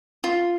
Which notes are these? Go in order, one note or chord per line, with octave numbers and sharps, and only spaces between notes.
F4